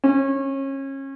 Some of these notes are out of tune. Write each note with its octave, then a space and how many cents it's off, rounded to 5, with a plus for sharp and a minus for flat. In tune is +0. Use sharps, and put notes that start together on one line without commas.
C#4 -30